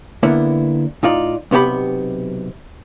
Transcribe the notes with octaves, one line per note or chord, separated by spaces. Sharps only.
D3 A#3 B3 E4
A2 D#4 F4 D5
B1 C3 B3 G4 B5